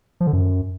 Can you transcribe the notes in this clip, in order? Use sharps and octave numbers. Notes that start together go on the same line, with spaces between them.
F3
D3
F#2